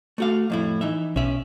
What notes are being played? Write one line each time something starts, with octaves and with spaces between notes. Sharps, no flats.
A3 F#4 F5
F2 A2 E4
E3 D#4 E5
B1 C#4 E5